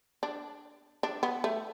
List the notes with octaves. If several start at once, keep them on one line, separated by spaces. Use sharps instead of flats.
D4
D4
B3
A3